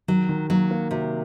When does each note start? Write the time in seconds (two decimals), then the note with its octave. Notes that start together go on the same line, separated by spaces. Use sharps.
0.08 D#3 F#3
0.29 D#3
0.50 F#3 A#3
0.71 A#3
0.91 C3 F#3